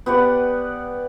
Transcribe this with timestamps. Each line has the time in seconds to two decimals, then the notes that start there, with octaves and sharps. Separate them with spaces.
0.06 B3 G4 D5 F#5